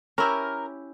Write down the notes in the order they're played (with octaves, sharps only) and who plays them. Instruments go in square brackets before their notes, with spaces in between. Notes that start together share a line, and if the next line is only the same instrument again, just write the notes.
[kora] C#4 E4 G4 [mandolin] A#4